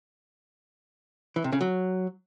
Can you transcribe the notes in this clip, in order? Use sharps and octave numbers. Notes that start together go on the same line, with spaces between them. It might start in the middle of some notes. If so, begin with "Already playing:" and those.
E3
C3
C#3
F#3